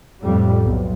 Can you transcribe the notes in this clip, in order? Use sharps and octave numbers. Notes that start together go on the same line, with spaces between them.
F2 A2 G3
B1